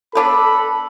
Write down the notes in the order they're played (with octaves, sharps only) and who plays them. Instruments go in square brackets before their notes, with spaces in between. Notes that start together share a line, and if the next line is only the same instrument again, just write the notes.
[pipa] B3 D4 B4 [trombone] A4 [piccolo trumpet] B5